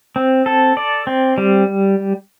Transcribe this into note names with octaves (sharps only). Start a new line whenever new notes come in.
C4
A4
D5
C4
G3